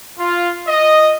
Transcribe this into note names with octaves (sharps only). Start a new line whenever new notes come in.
F4
D#5